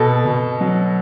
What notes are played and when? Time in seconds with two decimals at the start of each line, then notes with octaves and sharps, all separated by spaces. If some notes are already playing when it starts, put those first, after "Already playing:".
Already playing: B2 A4
0.25 B2
0.61 F#3